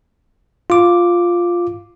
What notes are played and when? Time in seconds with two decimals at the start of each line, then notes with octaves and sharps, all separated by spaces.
0.70 F4 D6